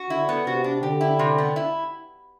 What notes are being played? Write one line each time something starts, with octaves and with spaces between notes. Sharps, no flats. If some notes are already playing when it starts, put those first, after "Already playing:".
Already playing: F#4
D3 E4
B3
C3 F#4
D4
D3 G4
E4
C3
B3
E4